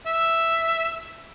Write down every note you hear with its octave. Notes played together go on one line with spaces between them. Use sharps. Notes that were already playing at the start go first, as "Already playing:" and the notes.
E5